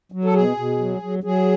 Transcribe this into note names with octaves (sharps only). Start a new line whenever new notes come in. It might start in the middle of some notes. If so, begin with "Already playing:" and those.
F#3
A4
B2 G#4
B2
F#3
F#3
F#3 G#4